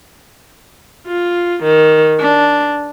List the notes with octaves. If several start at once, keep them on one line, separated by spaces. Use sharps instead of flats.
F4
D#3
D4